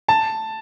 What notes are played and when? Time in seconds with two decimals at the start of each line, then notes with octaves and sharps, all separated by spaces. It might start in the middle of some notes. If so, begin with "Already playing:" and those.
0.08 A5